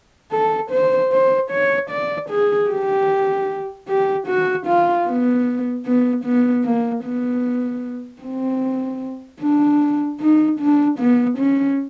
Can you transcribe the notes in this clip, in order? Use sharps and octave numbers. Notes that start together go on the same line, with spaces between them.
A4
C5
C5
C#5
D5
G#4
G4
G4
F#4
F4
B3
B3
B3
A#3
B3
C4
D4
D#4
D4
B3
C#4